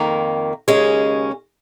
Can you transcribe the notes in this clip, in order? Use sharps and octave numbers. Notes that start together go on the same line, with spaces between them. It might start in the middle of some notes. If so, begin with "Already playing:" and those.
Already playing: F2 D#3 A#3
D#2 C#3 G#3 C#4